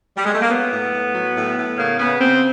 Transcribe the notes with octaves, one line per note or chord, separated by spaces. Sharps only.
G3
G#3
A3
A#3
F#3 B3
A2
A2
F#3
A2
A2
C#3 A#3
C#3 B3
C#3 C4